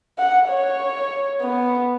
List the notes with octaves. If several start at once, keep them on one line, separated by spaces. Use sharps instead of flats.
F#5
C#5
B3